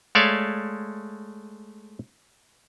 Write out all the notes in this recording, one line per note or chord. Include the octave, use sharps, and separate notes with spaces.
G#3 A3 C#5 D5 E5 F5